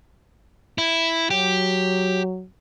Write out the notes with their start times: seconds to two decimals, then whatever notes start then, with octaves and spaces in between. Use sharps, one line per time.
0.78 E4
1.30 F#3 G4